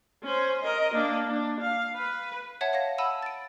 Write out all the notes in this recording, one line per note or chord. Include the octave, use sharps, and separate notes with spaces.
C#4 C5
A#4 D#5
A#3 D4
D4
F5
B4
C#5 E5 F#5 A5 G#6
C#5 F5 F#5 A#6
F#5 A5 B5 E6 D#7
A6 D7